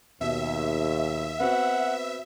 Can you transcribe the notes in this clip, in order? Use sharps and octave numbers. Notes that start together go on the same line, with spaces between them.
D#2 B2 E5
B3 C4 F#4 F#5